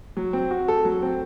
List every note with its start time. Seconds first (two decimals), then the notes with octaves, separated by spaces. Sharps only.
0.17 F#3
0.33 C4
0.51 F#4
0.68 A4
0.85 F#3
1.02 C4